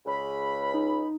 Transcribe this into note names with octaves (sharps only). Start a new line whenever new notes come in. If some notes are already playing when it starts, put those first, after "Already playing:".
C#2 C#3 B5
D#4